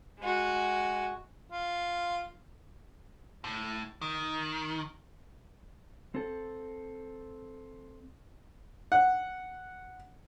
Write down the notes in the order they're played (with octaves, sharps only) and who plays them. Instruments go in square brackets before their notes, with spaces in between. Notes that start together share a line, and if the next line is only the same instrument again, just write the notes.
[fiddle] G#3 F#4
[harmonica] F4
[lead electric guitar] A2
D#3
[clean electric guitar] C4 A4
[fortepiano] F#5